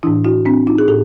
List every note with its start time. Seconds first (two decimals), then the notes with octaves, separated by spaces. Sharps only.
0.03 A2 E3 D4 E4
0.24 E4 F#4
0.46 C4 D4
0.67 D#4 F4
0.78 G#4
0.88 A2 G4 A4